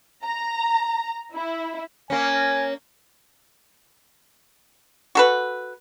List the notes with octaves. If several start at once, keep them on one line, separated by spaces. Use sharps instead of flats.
A#5
E4
A#3 C#4 G#5
F#4 A4 B4